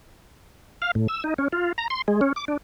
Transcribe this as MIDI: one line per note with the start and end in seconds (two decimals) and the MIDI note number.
0.82 0.91 77
0.95 1.07 45
1.08 1.23 88
1.24 1.34 63
1.38 1.48 61
1.53 1.72 65
1.78 1.88 82
1.90 2.02 84
2.08 2.21 56
2.21 2.33 61
2.36 2.45 86
2.48 2.57 62